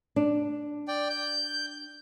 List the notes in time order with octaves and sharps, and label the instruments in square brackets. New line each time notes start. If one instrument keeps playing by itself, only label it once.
[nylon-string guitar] D4
[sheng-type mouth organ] D5 G5
G6